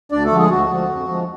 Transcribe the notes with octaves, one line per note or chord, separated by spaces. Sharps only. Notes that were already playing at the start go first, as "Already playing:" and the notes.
D2 D4 D5
A3 A4
D3 F3
G#3 G#4
D2 F#4
D3 F3
F2
F3 G#3